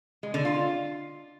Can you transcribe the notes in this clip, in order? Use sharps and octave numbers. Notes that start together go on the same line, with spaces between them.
G#3
D3
F4